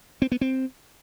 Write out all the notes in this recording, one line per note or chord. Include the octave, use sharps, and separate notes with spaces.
C4
B3
C4